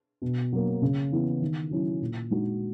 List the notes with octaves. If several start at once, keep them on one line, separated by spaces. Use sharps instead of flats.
B2
F#3 A#3
C#3
E3 B3 E4
D#3
F#3 C#4 E4
A#2
G#3 D#4 F#4